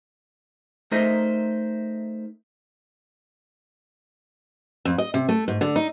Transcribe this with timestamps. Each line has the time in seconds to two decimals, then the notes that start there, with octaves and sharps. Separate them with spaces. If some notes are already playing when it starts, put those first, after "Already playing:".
0.91 A3 D#4 A#4 C5 D#5 E5
4.85 F2
4.98 D#5
5.14 C3
5.29 A3
5.48 G#2
5.61 D3
5.76 D#4